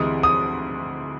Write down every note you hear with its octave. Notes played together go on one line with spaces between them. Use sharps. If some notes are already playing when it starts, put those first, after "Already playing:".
Already playing: D2 C3 E3 G#3 D#6
D#6